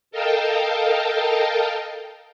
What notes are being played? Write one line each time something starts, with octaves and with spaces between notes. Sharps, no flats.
A4 A#4 D#5 F5 G5 A5